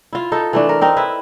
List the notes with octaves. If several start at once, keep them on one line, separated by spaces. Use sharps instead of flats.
E4 F4
D#4 A4
E3 A3 D4
A#4
C4 D#4 A#4
E4 B4